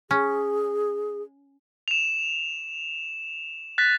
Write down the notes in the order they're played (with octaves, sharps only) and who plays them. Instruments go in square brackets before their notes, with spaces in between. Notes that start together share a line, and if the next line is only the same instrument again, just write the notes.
[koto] C#4 [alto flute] G#4
[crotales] E7 F7
F#6 A6 B6